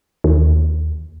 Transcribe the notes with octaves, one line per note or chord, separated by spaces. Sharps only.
D#2